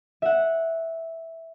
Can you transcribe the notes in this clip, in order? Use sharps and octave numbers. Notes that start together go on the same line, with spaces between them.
E5 F#5